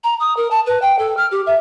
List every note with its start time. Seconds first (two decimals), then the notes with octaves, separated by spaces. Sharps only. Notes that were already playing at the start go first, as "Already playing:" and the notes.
0.04 A#5
0.20 D#6
0.37 A#4
0.51 A5
0.66 B4
0.82 G5
0.99 A4
1.17 F6
1.31 G4
1.46 E5